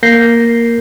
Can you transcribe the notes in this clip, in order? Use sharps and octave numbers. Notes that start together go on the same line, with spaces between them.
A#3 A#4 G6 A#6 C7